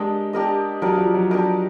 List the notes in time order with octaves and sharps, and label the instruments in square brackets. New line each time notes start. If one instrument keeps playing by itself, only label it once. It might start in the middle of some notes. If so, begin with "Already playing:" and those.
Already playing: [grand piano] G#3 [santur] D4 G4 A#4 D#5
[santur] D4 G4 A#4 D#5
[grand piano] F#3 [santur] D4 G4 A#4 D#5
[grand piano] F3
F#3
[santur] D4 G4 A#4 D#5